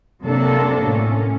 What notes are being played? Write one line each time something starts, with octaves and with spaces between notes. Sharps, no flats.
C3 F#3 A#3 D4 A4
A2 C#4